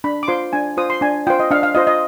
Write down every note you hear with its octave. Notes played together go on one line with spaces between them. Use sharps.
D4 B5
D6
F4 C5 C6
D4 G#5
F4 C5 D#6
C6
D4 G#5
F4 C5 G5
D#5
D4 F5
F5
F4 C5 D#5
D#5